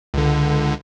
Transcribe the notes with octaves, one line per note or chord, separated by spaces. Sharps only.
C#2 D3